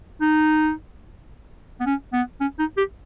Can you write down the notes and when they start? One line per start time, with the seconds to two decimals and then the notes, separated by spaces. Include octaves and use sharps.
0.21 D#4
1.80 B3
1.86 C#4
2.13 B3
2.41 C#4
2.59 D#4
2.77 G4